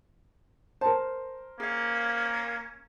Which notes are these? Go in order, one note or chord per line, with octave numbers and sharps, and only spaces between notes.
A#4 C5 A5
A#3 C#4 G#4 F5